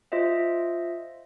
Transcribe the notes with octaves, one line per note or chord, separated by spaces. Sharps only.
F4 C5 D#5 E5